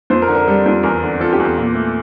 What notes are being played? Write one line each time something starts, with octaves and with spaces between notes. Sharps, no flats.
F2 C5
A#4
D3
A#4
G3 A4
F2
E2 A#4
D3
F3 A4
G4
E2
A4
A#2
A3